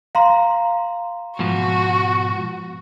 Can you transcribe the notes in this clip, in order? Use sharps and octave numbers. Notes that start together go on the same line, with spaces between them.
F5 A#5 C6
G#2 B2 F3 F#4